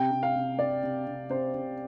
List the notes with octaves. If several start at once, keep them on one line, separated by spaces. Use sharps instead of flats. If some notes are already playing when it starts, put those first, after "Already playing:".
Already playing: C3 G5
C3
F5
C3
C3 D5
C3
C3
C3 C5
C3